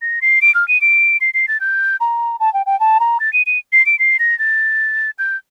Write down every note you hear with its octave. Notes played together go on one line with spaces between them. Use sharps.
A#6
C7
D7
F6
D#7
D7
C7
C7
A6
G6
A#5
A5
G5
G5
A5
A#5
A6
D#7
D#7
C7
D7
C7
A#6
A6
G6